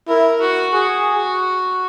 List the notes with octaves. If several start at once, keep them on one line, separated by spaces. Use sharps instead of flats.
E4 A#4
F#4
F#4 G#4